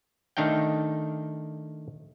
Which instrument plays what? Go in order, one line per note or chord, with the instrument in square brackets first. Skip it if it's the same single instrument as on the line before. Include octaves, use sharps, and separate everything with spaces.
[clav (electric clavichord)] D#3 A3 D4 D#4 F5 G5